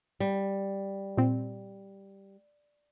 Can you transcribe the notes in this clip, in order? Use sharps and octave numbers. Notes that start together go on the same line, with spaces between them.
G3
A#2 C4